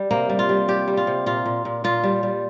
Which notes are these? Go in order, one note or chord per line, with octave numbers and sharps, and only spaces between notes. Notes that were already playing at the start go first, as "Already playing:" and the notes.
Already playing: G3
C3 A#3
G3
F4
G3
G3 G4
G3
F4
C3
A#2 F4
A#2
A#2
A#2 F4
G3
G3